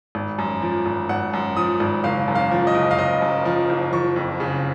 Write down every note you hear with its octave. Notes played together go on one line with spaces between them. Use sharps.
G#1
F#2
F3
G#1
G#1 F#5
F#2
F3 D#6
G#1
F#1 F5
F#2
F5
F3
D#5
F#1
F5
F#1 D#5
F#2
F3
F#1
F3 C#6
F2
C#3